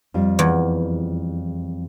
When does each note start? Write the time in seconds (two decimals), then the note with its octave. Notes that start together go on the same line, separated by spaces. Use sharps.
0.14 F2 G3 F4
0.39 E2